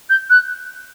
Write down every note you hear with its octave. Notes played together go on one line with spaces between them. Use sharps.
G6
F#6